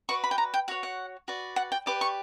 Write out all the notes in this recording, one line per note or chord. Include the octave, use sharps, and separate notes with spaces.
F#4 B4 D5 C#6
B5
G5
A#5
G5
F#4 C#5 F#5
F#5
F#4 B4 D5
F#5
G5
G4 B4 D5 D6
C#6